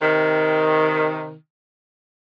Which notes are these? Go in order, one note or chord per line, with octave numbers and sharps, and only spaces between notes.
C3 D#3